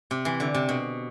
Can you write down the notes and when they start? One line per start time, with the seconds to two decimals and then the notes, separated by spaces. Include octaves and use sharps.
0.11 C3
0.25 E3
0.40 D3
0.54 C3
0.69 B2